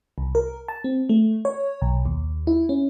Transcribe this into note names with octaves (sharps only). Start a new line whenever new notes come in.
C2
A#4
A5
C4
A3
C#5
B1
D#2
E4
C#4